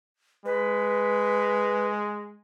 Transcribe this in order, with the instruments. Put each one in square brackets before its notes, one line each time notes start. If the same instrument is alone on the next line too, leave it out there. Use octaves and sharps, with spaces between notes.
[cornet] G#3 [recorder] B4